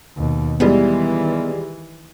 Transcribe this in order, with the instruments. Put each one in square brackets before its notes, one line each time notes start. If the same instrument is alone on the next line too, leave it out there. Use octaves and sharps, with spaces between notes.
[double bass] D#2 B2
[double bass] D#3 E3 [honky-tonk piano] G3 G#3 G4 [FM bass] B3